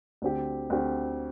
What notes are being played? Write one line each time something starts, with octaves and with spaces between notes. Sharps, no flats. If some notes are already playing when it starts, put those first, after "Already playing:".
D2 D3 C4 G4
D2 D3 C4 G4